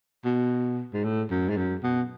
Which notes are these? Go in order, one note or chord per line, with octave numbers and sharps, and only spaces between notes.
B2
G#2
A2
F#2
G#2
F#2
B2